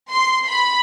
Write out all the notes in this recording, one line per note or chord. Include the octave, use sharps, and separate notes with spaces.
C6
B5